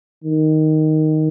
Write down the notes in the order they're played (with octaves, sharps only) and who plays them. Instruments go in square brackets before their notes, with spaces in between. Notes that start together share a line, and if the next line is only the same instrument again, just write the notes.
[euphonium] D#3